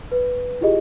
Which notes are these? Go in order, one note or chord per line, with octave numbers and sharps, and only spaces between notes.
B4
E4 F4 G4 G#4 D#5